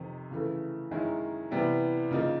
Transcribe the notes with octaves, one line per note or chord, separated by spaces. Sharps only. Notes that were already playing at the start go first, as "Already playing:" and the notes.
Already playing: F2 C3 D#3
C#3 E3 A3
F#2 D#3 G#3 C#4 E4
C3 E3 G3 B3 E4
C#3 F3 A#3 D#4